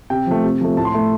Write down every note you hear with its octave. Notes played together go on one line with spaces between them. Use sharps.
C3 G5
F3 A3
C3
F3 A3
A2 A5
C6
A3